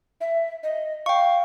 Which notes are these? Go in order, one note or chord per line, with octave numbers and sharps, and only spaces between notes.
E5
D#5
F5 G5 C#6